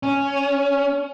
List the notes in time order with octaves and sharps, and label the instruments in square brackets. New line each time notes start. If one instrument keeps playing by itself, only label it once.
[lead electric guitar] C#4